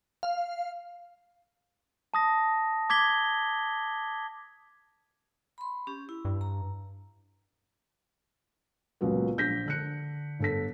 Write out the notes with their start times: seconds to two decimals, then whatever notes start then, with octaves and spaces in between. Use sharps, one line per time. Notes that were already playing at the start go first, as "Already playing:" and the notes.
0.23 F5
2.14 A5 D#6 A#6
2.90 D6 G#6 B6 G7
5.58 B5 C6
5.87 C#4 G4
6.09 E4
6.25 G2
6.41 A#5
9.01 C#2 A#2 F#3 B3
9.38 A#1 G6 A#6 B6
9.66 D3 F#6 C#7
10.40 G1 A4 B6